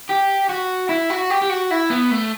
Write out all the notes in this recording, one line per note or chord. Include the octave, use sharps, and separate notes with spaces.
G4
F#4
E4
F#4
G4
G4
F#4
E4
B3
A3